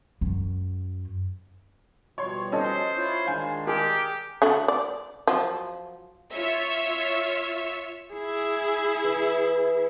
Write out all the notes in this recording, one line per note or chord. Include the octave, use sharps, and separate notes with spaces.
F#2
B2 F3 G3 C#5 C6
C#4 A4 C5 D#5
E4 F4 C#5
D#3 G#3 D4 F5 G#5
G4 G#4 A#4
D3 A3 F#4
D5
F3 F#3
F4 C#5 E5
E4 G#4
E3